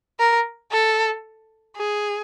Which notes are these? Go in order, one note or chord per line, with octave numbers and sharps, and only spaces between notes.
A#4
A4
G#4